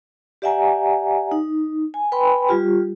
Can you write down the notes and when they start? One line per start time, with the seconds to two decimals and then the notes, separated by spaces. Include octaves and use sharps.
0.42 G4 D5 E5 F#5 G#5 A#5
1.32 D#4
1.94 G#5
2.12 B4 G5 G#5 B5 C6
2.49 G3 F4 G4